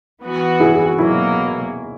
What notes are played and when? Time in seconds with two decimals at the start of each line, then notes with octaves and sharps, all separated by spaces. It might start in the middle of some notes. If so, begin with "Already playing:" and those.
0.22 E3 B3 F#4
0.60 E4 G#4
0.74 G#4
0.86 F#4
0.99 B2 F#3 A#3 E4